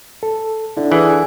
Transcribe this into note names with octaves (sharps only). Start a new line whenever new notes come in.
A4
D3 D4 E4
E3 G#4